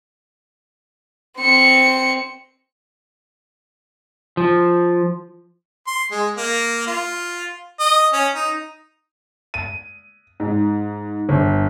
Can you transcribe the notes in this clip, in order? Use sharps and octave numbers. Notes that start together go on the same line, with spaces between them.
C4 C#7
F3
C6
G#3
A#3
F4
D#5
C#4
D#4
D#7
G#2
G1